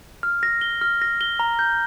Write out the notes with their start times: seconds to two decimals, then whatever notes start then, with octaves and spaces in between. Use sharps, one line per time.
0.23 F6
0.43 A#6
0.61 G7
0.81 F6
1.02 A#6
1.21 G7
1.39 A#5
1.59 G6